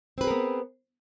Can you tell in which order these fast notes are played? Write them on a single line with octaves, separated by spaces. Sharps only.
C4 B4 G#4 A#4 B3